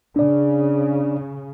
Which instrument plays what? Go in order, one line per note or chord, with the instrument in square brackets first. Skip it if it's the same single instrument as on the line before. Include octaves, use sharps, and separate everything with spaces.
[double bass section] C#3 [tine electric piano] D4 D5